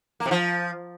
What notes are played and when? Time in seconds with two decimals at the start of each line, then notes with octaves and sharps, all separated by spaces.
0.20 A#3
0.26 C3
0.31 F3